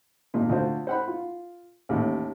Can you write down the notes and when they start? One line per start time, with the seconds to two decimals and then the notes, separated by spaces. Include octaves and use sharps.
0.34 G#1 A#2
0.49 D2 F4 F#4 C5
0.87 C5 F#5 B5
1.08 F4
1.89 A1 D#2